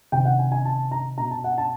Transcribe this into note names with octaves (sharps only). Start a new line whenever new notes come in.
C3 D#3 G5
F#5
G#5
G#5
A5
A#5
B2 A#5
A5
F#5
A5